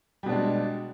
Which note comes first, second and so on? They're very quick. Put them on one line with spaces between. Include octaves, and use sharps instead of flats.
G3 B2 D4 G#3